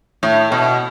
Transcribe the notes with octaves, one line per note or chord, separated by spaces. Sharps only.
A2
B2